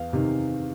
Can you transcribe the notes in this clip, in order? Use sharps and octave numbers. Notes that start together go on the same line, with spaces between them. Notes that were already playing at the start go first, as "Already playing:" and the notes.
Already playing: E2 F5
C3 D#3